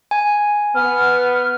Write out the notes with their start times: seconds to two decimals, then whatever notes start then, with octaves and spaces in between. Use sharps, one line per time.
0.11 G#5
0.75 B3 F6